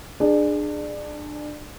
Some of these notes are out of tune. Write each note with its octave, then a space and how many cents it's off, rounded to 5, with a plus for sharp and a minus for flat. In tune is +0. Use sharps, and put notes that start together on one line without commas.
D4 +25 G#4 +0